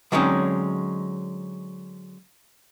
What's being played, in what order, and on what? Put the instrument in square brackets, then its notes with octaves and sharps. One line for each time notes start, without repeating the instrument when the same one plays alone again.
[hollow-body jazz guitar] D3 F#3 G#3 C4 C#4 D#4